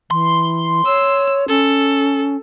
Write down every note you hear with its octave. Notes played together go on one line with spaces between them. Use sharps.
E3 C6
C#5 E6
C#4 A4